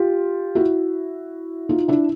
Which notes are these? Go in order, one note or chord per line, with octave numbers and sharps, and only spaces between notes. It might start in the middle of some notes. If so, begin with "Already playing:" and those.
Already playing: F4 G4
E4 F#4
D#4 F4
D4 E4